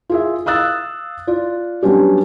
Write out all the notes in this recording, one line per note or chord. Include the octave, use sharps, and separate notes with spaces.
F4 G#4 E5
F5 D#6 E6 F#6 A6
F4 D5
F#3 G3 B3 C#4 D4 G4